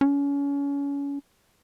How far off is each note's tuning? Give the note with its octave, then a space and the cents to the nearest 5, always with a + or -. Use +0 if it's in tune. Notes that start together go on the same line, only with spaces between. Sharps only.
C#4 +30